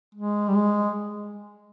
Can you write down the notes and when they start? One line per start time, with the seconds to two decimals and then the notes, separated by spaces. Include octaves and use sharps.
0.15 G#3
0.48 G3
0.55 G#3